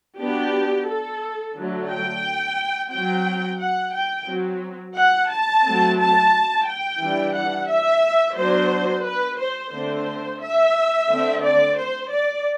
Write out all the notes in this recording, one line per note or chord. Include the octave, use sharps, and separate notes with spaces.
F#3 B3 D4 G4
A4
D3 F#3 A3
G5
F#3 C4 G5
F#5
G5
F#3 C4
F#5
A5
F#3 A3 C4
A5
G5
E3 G3 D4
F#5
E5
F#3 B3 D4 C5
B4
C5
D3 A3 C4 C5
E5
D3 A3 C4
D5
C5
D5